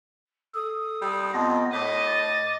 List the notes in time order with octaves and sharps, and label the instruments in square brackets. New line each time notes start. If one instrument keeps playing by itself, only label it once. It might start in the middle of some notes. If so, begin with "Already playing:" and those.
[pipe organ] A4 [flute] D#6
[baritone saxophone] G3
[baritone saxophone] F2 [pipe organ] B3 D#5
[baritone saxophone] A2 [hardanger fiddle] D#5 [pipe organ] D6 [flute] B6
[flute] A6